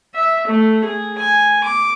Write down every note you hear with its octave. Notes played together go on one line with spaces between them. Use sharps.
E5
A3
G#4
G#5
D6